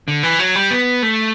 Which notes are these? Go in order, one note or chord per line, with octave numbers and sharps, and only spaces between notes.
D3
E3
F#3
G3
B3
A3